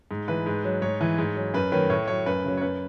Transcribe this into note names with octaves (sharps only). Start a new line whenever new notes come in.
G#2
E3 B4
G#2
F#3
G#2 C#5
E3
G#2
F#3
F#2 B4
D#3 F#3 B4
A2 C#5
F#3 C#5
F#2 B4
C#3 F#3
C#5
F#2 B4